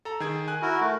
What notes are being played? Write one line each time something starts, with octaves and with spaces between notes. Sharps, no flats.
A4 A#5
D#3 G#4 G#6
G#5 F#6
E4 F#4 A#4
A3